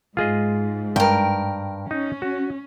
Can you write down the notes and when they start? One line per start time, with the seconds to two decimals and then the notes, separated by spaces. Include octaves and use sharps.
0.17 G#2 F4 G#4 D#5
0.96 G2 A#4 G5
1.91 C#4 D#4
2.22 F#4